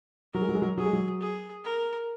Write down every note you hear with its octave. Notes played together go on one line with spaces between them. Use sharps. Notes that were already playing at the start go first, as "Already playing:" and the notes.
F#3 A#4
G#3
F#3
G#3
F#3
F#3 G#4
G#3
F#3
G#4
A#4